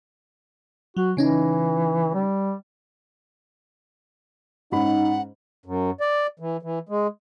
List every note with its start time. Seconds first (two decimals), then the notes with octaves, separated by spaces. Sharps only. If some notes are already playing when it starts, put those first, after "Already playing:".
0.97 F#3 F#4
1.17 C#3 E3 C#4 D#4
2.14 G3
4.72 G#2 C#4 D#4 F#5 B5
5.66 F#2
6.01 D5
6.39 E3
6.62 E3
6.89 G#3